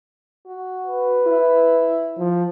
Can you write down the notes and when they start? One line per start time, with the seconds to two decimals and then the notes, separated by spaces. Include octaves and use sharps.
0.47 F#4
0.86 B4
1.27 E4
2.18 F3